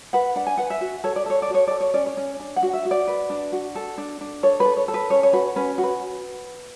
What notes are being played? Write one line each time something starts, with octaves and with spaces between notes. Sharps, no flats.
B4 F#5
D4 F#5
G#5
B4 F#5
E5
F#4
A4 C#5
D5
A4 C#5
D5
F#4 C#5
A4 D5
C#5
C#4 D5
C#5
C#4
D4
F#5
F#4
E5
F#4
D5
B4
D4
F#4
A4
D4
D4
A4 C#5
B4
A4
C#5
A4
B4
C#4 C#5
C#5
F#4 B4
C#4 B4
F#4
B4